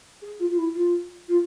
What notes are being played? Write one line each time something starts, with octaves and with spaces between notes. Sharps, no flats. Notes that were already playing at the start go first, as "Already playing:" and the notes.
G#4
F4
F4
E4
F4
F4